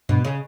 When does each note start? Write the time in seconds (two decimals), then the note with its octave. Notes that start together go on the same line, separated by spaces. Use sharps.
0.09 G2 B2
0.25 C#3